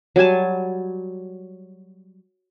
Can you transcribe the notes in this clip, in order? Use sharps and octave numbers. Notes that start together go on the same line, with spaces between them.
F#3 G3 G#5 A5